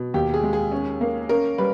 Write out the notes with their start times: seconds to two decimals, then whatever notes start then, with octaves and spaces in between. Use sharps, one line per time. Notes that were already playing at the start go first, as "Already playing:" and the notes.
Already playing: B2
0.14 D#2 G4
0.34 G#4
0.43 G#3
0.53 G#4
0.72 C#4
1.01 A#3
1.29 C#4 A#4
1.58 G3 B4